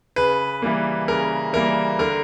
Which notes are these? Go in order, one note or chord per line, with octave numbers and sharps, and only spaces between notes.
C#3 B4
E3 G3 A#3
C#3 A#4
E3 G3 A#3 A#4
D3 A#4